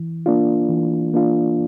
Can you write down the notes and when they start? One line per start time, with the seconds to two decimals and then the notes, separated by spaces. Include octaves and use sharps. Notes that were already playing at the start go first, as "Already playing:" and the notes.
Already playing: E3
0.26 A#3 D4 F4
0.69 E3
1.14 A#3 D4 F4